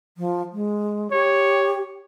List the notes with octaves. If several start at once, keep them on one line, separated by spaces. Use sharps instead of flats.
F3
G#3
G4 C#5